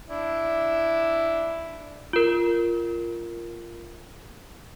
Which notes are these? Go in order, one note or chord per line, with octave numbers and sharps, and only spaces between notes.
D4 E4
F4 A#4